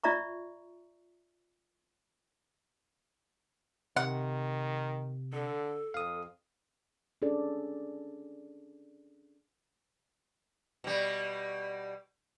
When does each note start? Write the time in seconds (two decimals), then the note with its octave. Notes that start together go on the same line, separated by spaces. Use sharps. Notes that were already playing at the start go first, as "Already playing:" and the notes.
0.04 F4 D5 E5 A#5 C#6
3.96 C3 D#3 F#5
5.33 D3 A4
5.94 F2 F5 D#6
7.22 C#4 D4 G#4 A4 D5
10.84 B2 G3